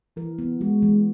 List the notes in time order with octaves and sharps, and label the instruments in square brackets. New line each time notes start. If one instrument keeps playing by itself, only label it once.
[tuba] E3 [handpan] A#4
[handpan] B3
[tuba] G#3 [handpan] F#4
[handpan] E3